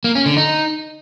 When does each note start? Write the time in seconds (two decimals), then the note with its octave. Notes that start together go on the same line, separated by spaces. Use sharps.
0.04 A#3
0.15 C#4
0.26 D3
0.37 D#4